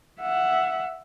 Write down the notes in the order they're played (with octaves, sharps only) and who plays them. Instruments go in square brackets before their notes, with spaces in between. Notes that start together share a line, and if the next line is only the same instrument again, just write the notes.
[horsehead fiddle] E5 F#5